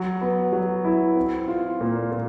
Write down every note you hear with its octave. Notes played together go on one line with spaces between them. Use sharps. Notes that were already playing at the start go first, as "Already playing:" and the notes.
Already playing: F#3
B3
F#3
E4
C4
F4
A#2
A#2